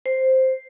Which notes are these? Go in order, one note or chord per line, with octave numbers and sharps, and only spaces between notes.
C5